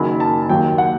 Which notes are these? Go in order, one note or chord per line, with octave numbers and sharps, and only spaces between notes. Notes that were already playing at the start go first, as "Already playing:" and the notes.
Already playing: F#1 F#2 D#3 F#3 B5
A5
D#2 D#3 F#3 G5
F#5